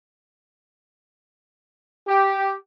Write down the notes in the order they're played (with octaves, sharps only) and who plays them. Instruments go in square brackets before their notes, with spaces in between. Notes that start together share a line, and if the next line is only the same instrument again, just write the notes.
[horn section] G4